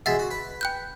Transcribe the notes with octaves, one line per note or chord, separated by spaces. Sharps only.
B2 G#3 E5 F#5 A6 B6
F#4
B4
G5 F#6 G6